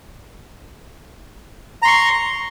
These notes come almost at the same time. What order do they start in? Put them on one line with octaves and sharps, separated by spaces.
A#5 C6 C#6